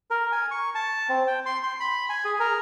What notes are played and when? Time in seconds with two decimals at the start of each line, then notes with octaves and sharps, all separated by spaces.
0.10 A#4
0.32 G#5
0.51 C#6
0.75 A5
1.09 C4
1.27 G5
1.46 C6
1.63 C6
1.80 B5
2.09 G#5
2.25 G#4
2.40 A#4